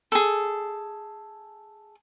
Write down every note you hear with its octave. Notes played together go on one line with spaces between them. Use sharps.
G#4 A4